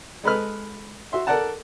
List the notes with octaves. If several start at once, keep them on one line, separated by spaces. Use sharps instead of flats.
G#3 A4 B4 D#5 B5 F6
F#4 E5 C6
A4 A#4 D5 F#5 A5